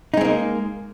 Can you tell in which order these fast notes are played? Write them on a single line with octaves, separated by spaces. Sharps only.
D#4 G#3 C4 A#3